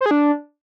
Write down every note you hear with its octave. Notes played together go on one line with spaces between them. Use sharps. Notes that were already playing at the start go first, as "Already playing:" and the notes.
C5
G#4
D4